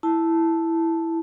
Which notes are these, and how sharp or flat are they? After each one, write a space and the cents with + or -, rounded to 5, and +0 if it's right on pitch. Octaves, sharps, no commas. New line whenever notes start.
E4 +0 A5 +0